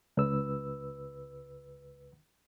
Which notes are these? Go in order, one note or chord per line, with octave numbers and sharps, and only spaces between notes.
C#2 B4 E6